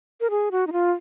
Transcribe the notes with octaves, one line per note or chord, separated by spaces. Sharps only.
A#4
G#4
F#4
D#4
F4